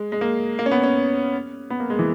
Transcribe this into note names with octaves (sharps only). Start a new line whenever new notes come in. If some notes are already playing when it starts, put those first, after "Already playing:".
Already playing: G#3
G#3
A#3
A#3
C#4
B3
C#4
B3
A#3
G#3
E3